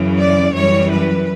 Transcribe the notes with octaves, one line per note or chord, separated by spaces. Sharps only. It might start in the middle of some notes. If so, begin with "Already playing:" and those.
Already playing: F#2 C#3 E3
D5
F#2 E3 G3 C#5
B4